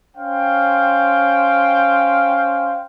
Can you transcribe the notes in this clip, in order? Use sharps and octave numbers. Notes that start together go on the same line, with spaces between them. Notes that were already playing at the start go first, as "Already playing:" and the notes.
C#4 C5 F5 G5